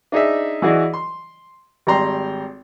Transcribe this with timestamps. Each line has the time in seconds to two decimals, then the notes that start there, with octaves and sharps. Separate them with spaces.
0.12 D4 D#4 G#4 E5
0.62 E3 E4 F#4 G#4 D5 D#5
0.93 C6
1.87 G#1 G3 G5 A#5 C6